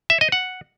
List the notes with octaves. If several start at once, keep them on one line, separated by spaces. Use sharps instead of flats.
E5
D#5
F#5